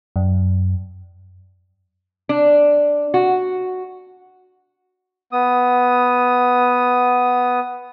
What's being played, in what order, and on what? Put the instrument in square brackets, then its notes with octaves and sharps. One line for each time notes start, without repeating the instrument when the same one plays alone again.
[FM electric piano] F#2
[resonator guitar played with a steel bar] D4
F#4
[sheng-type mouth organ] B3 D#6